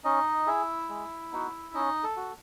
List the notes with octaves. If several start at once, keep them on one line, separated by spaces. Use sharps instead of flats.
C#4 D#4 D#5
E4 G#4 E5
G#3
B3 D#4 F#4
C#4 D#4 D#5
A4
F#4